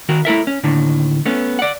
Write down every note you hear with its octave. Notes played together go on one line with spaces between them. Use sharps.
D#3 F#4 A#4
A3 E4 A#4 E5
C#4
D#2 A2 D3 D#3
A3 B3 C#4
D5 F#5